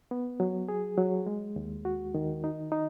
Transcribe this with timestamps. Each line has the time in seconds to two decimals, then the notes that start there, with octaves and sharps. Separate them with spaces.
0.11 B3
0.40 F#3
0.69 G#4
0.97 F#3
1.26 G#3
1.56 D#2
1.85 F#4
2.15 D#3
2.44 D#4
2.72 D#4